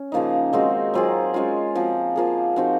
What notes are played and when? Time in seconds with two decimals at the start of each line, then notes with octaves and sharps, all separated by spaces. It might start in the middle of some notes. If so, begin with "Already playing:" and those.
Already playing: C#4
0.12 C#3 F3 A#3 D#4
0.53 D#3 G#3 C4 F#4
0.94 F#3 C4 F4 G#4
1.34 G#3 C#4 F4
1.75 F3 C4 F#4
2.16 F3 A#3 F4 G#4
2.56 F3 C4 D#4 F#4